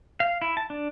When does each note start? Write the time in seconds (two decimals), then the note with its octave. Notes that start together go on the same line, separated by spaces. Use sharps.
0.20 F5
0.42 E4
0.57 A5
0.70 D4